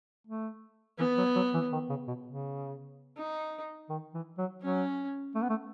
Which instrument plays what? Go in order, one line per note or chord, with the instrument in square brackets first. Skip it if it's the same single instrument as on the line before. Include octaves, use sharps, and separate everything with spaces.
[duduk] A3
[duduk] E3 [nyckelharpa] B3
[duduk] F#3
F#3
E3
D#3
C#3
B2
C#3
[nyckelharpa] D#4
[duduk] D#3
E3
F#3
[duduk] F#3 [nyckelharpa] C#4
[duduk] A3
B3
A3